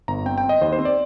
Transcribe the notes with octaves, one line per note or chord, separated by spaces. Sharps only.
G1 A#5
C4 G5
G5
C4
D#5
D#2 C5
C5
C4
D5